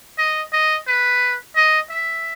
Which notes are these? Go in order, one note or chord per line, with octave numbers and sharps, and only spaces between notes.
D#5
D#5
B4
D#5
E5